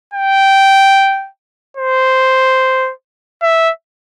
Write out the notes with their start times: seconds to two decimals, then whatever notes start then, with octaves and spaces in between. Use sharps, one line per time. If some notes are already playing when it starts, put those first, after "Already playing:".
0.13 G5
1.77 C5
3.42 E5